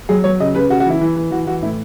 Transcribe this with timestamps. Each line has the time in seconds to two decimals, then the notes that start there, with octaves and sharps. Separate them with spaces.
0.09 F#3 G#4
0.24 F#3 C#5
0.40 C#3 D#5
0.55 C#3 B4
0.70 C#3 F#4
0.80 F#4
0.86 E3 E4
1.01 E3
1.16 E3
1.31 E3 F#4
1.47 E3 F#4
1.62 A2 E4